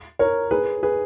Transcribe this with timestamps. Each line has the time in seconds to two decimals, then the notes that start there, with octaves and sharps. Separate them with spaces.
0.19 A#4 C#5
0.51 G#4 B4
0.83 G#4 B4